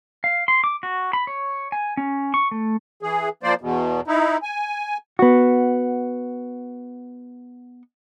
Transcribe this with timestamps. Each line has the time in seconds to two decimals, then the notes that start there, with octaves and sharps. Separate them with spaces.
0.24 F5
0.48 C6
0.64 D6
0.83 F#4
1.13 B5
1.27 C#5
1.72 G#5
1.97 C#4
2.34 C#6
2.51 A3
3.03 E3 G#4
3.43 F3 A#3 C5 D5
3.61 E2 B2
4.07 D#4 E4
4.43 G#5
5.19 B3 F#4